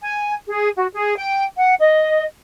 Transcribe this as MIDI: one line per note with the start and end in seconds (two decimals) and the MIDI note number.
0.02 0.34 80
0.47 0.69 68
0.77 0.87 66
0.94 1.16 68
1.17 1.44 79
1.57 1.74 78
1.79 2.25 75